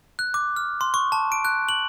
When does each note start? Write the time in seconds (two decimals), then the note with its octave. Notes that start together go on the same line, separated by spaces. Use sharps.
0.19 F#6
0.34 D6
0.56 F6
0.81 C6
0.94 C#6
1.12 A5
1.32 D7
1.45 F#6
1.69 F#7